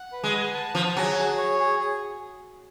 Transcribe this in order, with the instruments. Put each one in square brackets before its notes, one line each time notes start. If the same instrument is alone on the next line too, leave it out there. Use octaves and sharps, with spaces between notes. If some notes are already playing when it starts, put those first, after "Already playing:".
Already playing: [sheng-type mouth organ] F#5
B4
[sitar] G#3
[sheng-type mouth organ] F#5
A5
[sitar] F3 [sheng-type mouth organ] F#5
[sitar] F#3 [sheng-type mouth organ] G#4
[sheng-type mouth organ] G#4
C#5
G#4
G#4